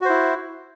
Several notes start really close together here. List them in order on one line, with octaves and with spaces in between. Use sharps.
F#4 C5 E4